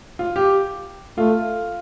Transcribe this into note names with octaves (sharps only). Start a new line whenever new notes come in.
F4
G4
A3 F4